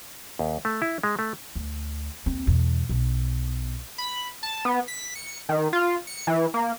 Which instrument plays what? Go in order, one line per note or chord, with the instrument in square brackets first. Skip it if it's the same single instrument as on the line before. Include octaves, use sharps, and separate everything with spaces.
[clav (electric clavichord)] D#2
A3
E4
G#3
A3
[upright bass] D2
D#2 C4
E2 B2
B1
[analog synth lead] B5
A5
B3
B6
C#7
D#3
F4
C#7
E3
A#3